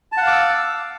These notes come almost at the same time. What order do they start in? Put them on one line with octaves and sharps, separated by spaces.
A5 F#5 F5 D6 E6